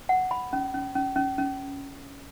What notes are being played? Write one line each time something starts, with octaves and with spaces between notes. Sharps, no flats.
F#5
B5
C#4
C#4
C#4
C#4
C#4